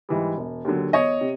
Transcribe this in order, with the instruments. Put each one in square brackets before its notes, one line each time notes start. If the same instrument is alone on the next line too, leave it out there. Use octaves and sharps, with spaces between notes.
[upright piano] G#2 E3 G3
E1
D#2 D3 F#3
E2 C#5 D#5
C3